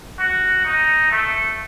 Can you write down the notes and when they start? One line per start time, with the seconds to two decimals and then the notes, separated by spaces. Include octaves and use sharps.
0.19 F#4
0.65 D#4
1.11 A3